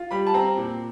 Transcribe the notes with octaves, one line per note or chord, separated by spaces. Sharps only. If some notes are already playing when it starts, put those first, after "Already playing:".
Already playing: F4
G3 B5
A5
C4 A#5
A#2